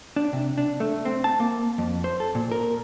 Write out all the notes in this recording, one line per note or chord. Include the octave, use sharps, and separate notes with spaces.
D4
C3
D4
A3
C4
A5
A#3
F2
C5
A4
A#2
A#4